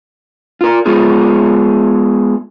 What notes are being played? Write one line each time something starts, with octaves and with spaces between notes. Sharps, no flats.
F4 A#4
G#3 B3 F4 G#4